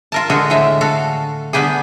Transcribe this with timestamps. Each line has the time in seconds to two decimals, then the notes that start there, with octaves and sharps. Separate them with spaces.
0.12 F4 A#4 A5
0.30 D3 G#3 F#4 G#4 A4
0.50 A2 D3 G#3 E5
0.81 F#4 A4 F5
1.53 D3 G3 B3 G4 G#4